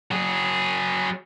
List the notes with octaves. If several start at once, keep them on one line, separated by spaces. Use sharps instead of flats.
F#3 G#4